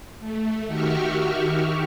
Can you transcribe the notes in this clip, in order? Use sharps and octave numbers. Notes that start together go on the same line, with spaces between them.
A3
D#3 F#4 G4 E5 C#6 F6